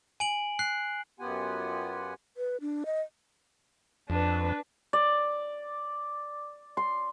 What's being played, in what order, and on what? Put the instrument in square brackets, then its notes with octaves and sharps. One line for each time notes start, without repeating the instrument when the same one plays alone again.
[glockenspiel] G#5 D7 F#7
F#6 C7
[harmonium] F#2 B3 F4 G4 F#5 G#5
[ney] B4
D4
D#5
[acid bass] F2 [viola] D4 B4
[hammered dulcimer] D5
C6